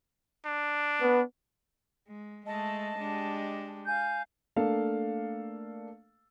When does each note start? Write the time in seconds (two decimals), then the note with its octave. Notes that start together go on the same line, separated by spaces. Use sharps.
0.46 D4
1.01 B3
2.07 G#3
2.45 G#3 A3 D#5 A5
2.98 G#3 D4 G4
3.85 F5 G#5 G6
4.56 A3 A#3 D4 A4 F5